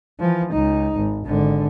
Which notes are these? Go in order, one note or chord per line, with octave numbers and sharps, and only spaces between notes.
E3 F3
C#2 D#4
G#1
G#1 D3